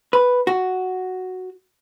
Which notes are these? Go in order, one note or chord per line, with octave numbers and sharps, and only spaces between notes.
B4
F#4